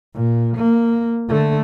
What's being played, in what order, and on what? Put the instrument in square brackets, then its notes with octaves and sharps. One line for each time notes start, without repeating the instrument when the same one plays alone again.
[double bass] A#2
A#3
D3 A3